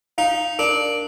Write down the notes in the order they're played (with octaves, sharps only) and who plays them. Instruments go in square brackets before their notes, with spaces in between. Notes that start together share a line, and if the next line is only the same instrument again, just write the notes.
[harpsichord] D#4 [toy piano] F5
[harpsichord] D4 [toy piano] A#4